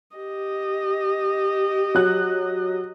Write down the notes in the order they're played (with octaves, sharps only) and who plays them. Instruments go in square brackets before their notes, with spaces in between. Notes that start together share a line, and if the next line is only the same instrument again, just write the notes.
[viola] G4 D#5
[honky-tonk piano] F#3 F#6